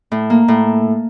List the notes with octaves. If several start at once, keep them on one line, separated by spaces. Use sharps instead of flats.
A2
A#3
A2